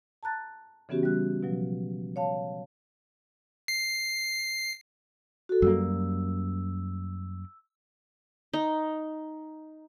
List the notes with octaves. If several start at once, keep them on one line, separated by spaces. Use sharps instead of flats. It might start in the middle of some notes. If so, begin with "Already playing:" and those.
A5 A#5 F#6 A6
C#3 E3 B3 C#4 F#4 G4
G3 F#6
B2 F3 F#3
C#5 F5 A5
C7
F#4 A4
F#2 G3 A#3 E6
D#4